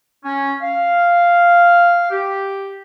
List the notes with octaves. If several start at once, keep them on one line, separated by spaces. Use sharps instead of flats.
C#4
F5
G4